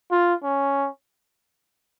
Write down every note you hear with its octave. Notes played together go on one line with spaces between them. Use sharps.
F4
C#4